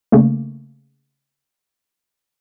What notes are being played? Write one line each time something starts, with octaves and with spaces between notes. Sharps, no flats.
C#3 A3 A#3